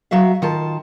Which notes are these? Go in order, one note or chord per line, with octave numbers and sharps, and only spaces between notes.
F#3 F#4 E5 F5
D#3 F4 A5